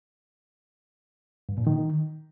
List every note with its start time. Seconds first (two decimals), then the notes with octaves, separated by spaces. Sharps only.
1.49 G2
1.58 A#2
1.67 D#3